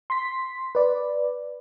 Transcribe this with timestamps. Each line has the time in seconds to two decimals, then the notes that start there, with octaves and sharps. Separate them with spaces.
0.10 C6 B6
0.75 B4 D5